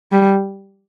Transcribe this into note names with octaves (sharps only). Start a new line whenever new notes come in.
G3